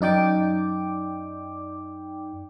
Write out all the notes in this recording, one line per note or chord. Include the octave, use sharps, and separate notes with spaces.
F#2 D#4 D5 G5 D6